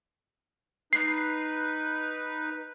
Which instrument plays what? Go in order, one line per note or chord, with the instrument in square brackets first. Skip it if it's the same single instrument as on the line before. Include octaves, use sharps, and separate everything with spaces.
[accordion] D#4 B4 [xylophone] C7